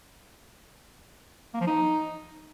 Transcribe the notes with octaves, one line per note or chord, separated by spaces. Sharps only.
A#3
F3
D#4